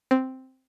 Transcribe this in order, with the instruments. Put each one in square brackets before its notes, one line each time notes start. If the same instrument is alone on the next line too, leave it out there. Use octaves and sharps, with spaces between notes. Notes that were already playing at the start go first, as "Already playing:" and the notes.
[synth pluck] C4